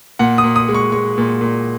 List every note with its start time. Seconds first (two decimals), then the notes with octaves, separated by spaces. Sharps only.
0.19 A#2 F#5
0.38 D#6
0.44 A#2
0.56 D#6
0.69 G#3
0.75 C#6
0.92 G#3 C#6
1.18 A#2
1.41 A#2